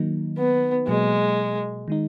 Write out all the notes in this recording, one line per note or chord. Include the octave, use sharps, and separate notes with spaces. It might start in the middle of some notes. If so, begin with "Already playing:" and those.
Already playing: D#3 F#3 A#3 D#4
B3
B2 F#3 G#3 A#3
D#3 G#3 D#4